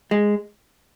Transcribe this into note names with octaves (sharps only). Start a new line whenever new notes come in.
G#3